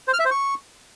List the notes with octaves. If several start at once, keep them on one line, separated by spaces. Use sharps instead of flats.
C5
F6
E5
C5
C#6